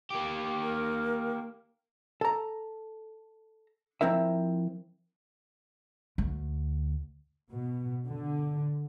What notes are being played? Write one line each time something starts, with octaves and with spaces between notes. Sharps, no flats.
A#3 G4
A#4
A4 A#5
F3 C4 E4 A#4 E5
D2
B2
D3